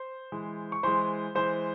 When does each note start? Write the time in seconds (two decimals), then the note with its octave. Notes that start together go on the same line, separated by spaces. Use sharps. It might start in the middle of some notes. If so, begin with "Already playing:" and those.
Already playing: C5 C6
0.32 E3 G#3
0.72 C#6
0.83 E3 G#3 C5 C6
1.35 E3 G#3 C5 C6